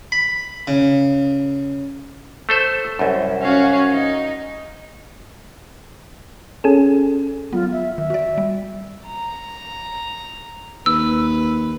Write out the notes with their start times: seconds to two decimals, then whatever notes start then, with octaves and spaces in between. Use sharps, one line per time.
0.12 B5
0.67 C#3
2.49 A3 A4 C5
2.99 C2 F#2
3.42 C#4 F#4 F5
3.91 D#4
6.64 C#4 G#4 A4
7.53 F#3 B3 F4
7.72 E5
7.98 D#3 E5
8.10 F#4 D5
8.38 G3
9.06 A#5
10.86 D#2 B4 E6